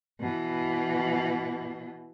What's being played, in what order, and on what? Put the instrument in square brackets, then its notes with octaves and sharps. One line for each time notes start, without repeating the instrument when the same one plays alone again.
[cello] B2 E3